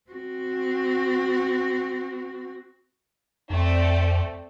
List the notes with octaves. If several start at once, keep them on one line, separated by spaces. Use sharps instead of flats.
C4 F#4
F2 A3 C4 D5